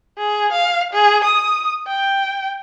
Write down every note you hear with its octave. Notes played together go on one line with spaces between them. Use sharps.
G#4
F5
G#4
D#6
G5